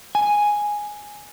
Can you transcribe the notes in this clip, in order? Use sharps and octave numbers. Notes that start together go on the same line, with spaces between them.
G#5